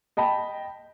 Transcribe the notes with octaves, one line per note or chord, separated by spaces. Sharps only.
D#5 G5 A5 B5